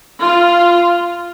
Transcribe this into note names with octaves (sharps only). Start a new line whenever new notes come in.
F4